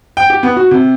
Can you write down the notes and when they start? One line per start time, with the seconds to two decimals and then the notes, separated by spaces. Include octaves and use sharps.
0.17 G5
0.30 G4
0.43 B3
0.56 F#4
0.71 C3